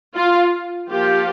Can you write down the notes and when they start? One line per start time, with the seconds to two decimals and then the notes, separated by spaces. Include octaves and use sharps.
0.16 F4
0.90 F3 A#3 F4 G4